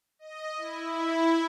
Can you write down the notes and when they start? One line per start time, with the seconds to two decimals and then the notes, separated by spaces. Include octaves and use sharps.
0.19 D#5
0.57 E4